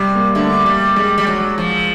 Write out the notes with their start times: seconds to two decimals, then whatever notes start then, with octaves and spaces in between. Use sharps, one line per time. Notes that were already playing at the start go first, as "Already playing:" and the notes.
Already playing: C3 G3
0.15 A#3
0.35 D3 A3
0.66 G3
0.96 G3 G#3
1.18 G3
1.27 F#3
1.58 F3